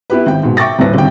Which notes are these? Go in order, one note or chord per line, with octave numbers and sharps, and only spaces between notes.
B3 E4 G4 B4
G#1 G5
G#2 B2
E5 G5 C#6 D6 A6 A#6
D#1 A2 B4 A#6
G1 C3 D#3 G5